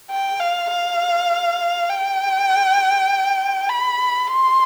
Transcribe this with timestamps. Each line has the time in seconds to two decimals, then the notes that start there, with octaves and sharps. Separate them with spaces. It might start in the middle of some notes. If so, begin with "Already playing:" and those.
0.11 G5
0.40 F5
0.70 F5
1.90 G5
3.69 B5
4.28 C6